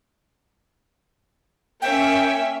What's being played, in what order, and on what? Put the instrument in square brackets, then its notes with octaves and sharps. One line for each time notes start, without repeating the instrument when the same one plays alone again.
[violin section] A#3 C#4 E5 [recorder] G5